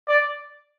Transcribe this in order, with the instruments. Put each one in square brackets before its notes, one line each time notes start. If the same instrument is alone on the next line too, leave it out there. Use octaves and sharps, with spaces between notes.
[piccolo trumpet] D5